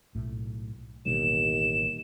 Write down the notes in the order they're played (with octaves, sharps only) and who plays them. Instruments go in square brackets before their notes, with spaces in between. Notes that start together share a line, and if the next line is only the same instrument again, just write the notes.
[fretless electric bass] B1 A2 A3
[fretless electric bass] A1 B2 G3 [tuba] D#2 [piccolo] E7